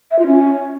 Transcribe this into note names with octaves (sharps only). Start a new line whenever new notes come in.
E5
F4
C#4